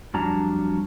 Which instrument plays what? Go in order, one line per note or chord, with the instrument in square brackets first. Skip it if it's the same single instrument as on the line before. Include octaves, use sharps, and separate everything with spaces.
[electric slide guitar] F2 F#3 G3 D4 A5 A#5